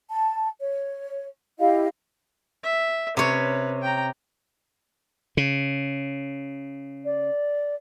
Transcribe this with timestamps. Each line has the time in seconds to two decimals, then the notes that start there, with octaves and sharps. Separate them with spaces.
0.11 A5
0.60 C#5
1.59 E4 G4 D#5 F5
2.63 E5
3.17 C3 C#4 B4 C#5
3.82 G5 A#5
5.37 C#3
7.05 D5